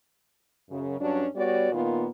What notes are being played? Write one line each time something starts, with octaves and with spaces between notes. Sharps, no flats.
F#2 C#3
G2 F#3 C#4 D4
G3 B3 F#4 C#5 D5
A#2 D#3 A#3 B3 F4